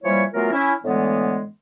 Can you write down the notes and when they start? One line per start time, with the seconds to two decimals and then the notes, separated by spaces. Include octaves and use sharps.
0.03 E3 F3 G3 A#3 E4 C#5
0.32 E3 F#3 A3 B3 F4 A#4
0.52 C#4 E4
0.83 A2 D3 E3 G#3 A3 B3